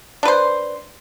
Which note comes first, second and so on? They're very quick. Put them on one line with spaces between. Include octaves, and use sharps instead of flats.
D4 B4 C5